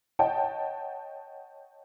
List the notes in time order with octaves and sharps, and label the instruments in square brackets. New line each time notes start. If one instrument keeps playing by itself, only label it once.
[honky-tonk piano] C#5 D#5 F#5 G5 A5